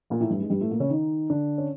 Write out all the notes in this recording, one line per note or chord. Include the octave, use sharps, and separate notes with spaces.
A#2 A#3
A2 A3
G2 G3
G#2 G#3
G2 G3
A2 A3
A#2 A#3
C#3 C#4
D#3 D#4
D3 D4
C#4